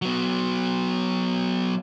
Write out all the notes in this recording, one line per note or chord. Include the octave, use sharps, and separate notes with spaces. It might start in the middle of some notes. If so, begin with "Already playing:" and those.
F#3 B3